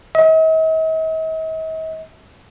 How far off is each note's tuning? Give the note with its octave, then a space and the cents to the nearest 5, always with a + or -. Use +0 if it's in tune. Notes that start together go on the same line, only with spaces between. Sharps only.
D#5 +45